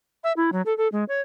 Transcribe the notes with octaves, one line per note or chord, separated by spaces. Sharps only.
E5
E4
F#3
A4
A4
G#3
C#5